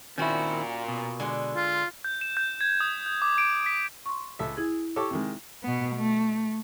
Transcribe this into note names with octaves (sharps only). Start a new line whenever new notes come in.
A#2 D#3 C4 C#4 E4 F#4
B2
D3 G#3
F4
G6
E7
G6
G#6
D#6
G6
D6
D7
B6
C6 C#6
C#2 A4 E5
E4 G#4 G#6
G4 A4 C#5 C#6 D6
C3 D#3 G#3
B2 B3
A3